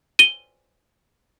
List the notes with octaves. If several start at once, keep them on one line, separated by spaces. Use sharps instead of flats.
D#7 G7